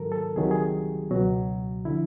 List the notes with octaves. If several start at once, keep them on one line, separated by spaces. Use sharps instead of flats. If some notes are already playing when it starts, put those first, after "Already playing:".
Already playing: G#2 D#3 F#3 A4 A#4
A4
C2 C3 D#3 F#3 G#4
G4
G#4
C#2 B2 F#3 F#4
D3 F3 E4